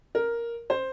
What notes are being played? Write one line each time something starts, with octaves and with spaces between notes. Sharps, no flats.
A#4
C5